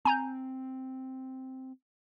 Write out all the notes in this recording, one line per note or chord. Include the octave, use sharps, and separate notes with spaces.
C4 G#5 A#5 G6